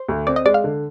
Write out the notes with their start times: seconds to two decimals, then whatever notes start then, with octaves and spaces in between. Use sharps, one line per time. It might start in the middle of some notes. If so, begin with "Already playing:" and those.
Already playing: C5
0.09 D2
0.27 C4 D5
0.36 D#5
0.45 G#3 D5
0.54 F5
0.64 D3